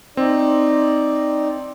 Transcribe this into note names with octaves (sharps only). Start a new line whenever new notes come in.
C4 D#4 D5